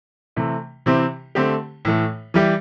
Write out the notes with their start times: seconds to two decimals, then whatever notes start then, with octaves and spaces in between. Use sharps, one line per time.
0.36 C3 E3 A3
0.86 C3 E3 C4 E4 G4
1.35 D3 A3 C4 G4
1.85 A2 E3 A3
2.34 E3 G3 E4 G4